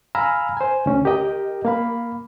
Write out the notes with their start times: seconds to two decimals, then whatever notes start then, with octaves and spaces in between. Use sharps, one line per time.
0.15 F5 G#5 A#5 B5 E6 F6
0.57 C5 G#5
0.86 D2 C#4
1.05 G4 A#4 D#5 G5
1.65 A#3 F5 B5